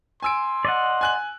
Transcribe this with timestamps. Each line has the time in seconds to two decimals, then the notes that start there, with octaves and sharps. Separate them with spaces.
0.22 G#5 C6 E6 D7
0.65 D5 D#5 F#5
1.01 G#5 F#6 F#7